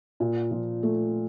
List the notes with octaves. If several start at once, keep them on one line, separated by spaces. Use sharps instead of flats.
A#2
F3
A3